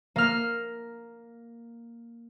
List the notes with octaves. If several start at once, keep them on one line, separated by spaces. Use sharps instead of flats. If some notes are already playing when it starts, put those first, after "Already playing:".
A#3 F6